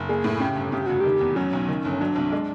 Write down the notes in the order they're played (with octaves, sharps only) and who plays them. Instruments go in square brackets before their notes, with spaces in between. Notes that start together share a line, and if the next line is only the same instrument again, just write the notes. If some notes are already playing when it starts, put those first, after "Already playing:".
Already playing: [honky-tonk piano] F#1
[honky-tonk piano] A#3 [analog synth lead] G#4
[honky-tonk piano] A2
[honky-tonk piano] C#3 [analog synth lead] G4
[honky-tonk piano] G1
[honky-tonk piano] C#3 [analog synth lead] G4
[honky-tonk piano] F1 [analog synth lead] F#4
[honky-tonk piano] D#3 [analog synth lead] G4
[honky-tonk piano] E2
[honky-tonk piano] F#3 [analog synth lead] C#4
[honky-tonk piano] B1
D#3
G1
[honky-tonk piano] F#3 [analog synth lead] D4
[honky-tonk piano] C2
G#3